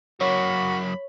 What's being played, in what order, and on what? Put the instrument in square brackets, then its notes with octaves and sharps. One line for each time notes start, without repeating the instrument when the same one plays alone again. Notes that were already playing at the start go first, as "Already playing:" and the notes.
[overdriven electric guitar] F#2 A#3 [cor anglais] F#4 [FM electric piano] C#5 [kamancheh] B5